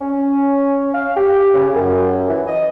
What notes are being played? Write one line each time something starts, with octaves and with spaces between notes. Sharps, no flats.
C#4
F5
G4
C#3
F#2
E3
D#5